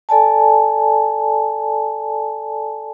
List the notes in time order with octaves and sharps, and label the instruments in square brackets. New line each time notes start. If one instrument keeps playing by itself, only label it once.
[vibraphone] A4 D5 G#5 A5